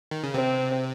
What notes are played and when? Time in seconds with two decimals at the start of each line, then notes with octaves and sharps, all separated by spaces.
0.11 D#3
0.24 C#3
0.34 C3 C4